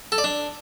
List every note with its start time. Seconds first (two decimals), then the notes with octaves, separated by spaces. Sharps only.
0.12 A4
0.18 D5
0.24 D4